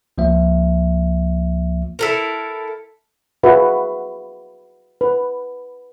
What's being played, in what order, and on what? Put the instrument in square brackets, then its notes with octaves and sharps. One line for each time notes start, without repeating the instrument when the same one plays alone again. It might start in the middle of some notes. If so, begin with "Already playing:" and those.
[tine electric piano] C#2 F3 A#3 E5
[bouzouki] E4 A4 A#4
[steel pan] F4 F#4 G#4 B4 E5
B4